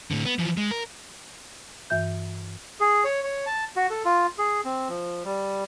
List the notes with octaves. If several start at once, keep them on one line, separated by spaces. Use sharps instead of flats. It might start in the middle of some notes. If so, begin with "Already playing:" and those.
A2 D3
B3
E3 F3
G#3
A#4
G2 E3 E5 G6
G#4
C#5
C#5
A5
F#4
A4
F4
G#4
C4
F3
G3